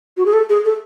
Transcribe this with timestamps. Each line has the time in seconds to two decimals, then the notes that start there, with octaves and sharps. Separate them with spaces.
0.17 F#4
0.26 G#4
0.33 A4
0.49 G#4
0.65 A4